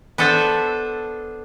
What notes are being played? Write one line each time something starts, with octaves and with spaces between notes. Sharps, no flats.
B3 D4 A4 C5 E5